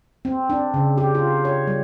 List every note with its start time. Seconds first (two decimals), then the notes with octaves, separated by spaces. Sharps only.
0.25 C4
0.50 D4
0.74 C#3
0.98 G4
1.15 F4
1.45 C#5
1.67 G3